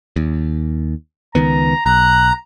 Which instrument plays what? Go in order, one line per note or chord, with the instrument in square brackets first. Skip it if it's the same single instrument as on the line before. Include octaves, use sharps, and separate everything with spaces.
[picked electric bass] D#2
[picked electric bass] C#2 D#3 B3 [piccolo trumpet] A#5
[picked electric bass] B1 [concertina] A#5 [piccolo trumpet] F#6